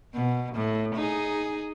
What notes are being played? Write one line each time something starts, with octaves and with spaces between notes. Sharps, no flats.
B2
A2
D#4 G#4